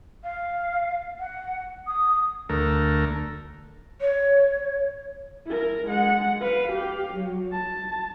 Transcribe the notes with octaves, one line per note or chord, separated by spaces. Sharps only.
F5
F#5
D#6
D2 A3 A#4
C#5
E4 A#4
G#3 F#5
B4 F5
G4 F5
F#3
A5